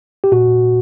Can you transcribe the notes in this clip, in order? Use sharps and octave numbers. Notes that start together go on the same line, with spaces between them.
G4
A#2 F#4